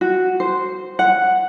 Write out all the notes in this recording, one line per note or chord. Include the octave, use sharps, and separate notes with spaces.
F#4
C5
F#5